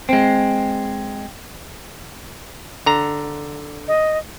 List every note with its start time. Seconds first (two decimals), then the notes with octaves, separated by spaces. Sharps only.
0.09 G#3 C4
2.86 D3 A#5
3.88 D#5